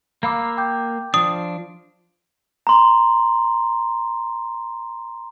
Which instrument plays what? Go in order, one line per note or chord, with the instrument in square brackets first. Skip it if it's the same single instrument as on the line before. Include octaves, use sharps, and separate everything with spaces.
[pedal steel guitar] A#3 F5 E6 [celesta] A#5 B5 D6
[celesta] G5 D6 G6
[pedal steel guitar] F3 D4 [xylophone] D#6
[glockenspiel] A#5 C6